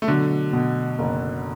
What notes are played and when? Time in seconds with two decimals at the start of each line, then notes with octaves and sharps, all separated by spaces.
0.02 A3
0.08 B2 D3 F#3
0.53 B2
0.99 F#1